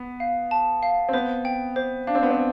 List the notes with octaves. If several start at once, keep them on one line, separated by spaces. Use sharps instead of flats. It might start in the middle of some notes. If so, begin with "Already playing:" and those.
Already playing: B3
F5
A5
F5
C4
B3 C5
G5
C5
D4 F5
C4
B3
C4